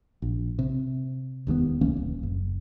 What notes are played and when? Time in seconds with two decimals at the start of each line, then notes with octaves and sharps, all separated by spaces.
0.22 A#1
0.59 C3
1.47 E1 D#2 A#2 B3
1.81 C#2 E3 A#3 C#4
1.96 D#1
2.23 F#1